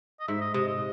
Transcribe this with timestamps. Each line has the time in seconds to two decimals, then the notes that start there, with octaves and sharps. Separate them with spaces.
0.20 D#5
0.28 G#2 E5
0.41 D#5
0.54 C3 D#5
0.67 D#5